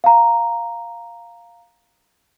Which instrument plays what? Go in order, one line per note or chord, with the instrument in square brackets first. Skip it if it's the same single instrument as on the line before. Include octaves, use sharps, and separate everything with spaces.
[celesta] F5 A#5